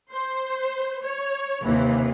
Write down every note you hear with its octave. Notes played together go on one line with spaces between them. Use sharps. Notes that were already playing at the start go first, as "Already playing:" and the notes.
C5
C#5
D#2 C3 D#3 E3